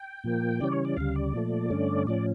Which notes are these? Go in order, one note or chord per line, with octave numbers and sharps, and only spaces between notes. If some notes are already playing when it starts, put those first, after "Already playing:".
Already playing: G5
A#2 F3 A#3
C#3 E3 G3 C#4 D5
C#5
D5
D2 C#3 G3 F5
D5
A#2 F3 A3
G2 D3 A3 C#4
A2 F3 C#4 D5